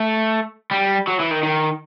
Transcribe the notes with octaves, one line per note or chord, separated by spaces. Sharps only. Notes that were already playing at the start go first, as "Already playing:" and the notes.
Already playing: A3
G3
F#3
E3
D#3
D#3